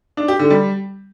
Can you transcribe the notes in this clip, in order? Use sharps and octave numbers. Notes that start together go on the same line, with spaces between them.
D4
G4
D3
G3